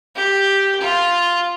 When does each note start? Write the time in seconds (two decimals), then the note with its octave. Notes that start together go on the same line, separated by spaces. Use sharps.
0.16 G4
0.80 F4